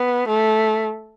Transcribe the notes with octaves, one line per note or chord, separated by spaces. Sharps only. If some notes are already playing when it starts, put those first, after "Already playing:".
Already playing: B3
A3